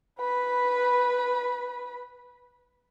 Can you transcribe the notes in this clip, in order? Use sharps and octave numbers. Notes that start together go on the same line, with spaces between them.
B4 B5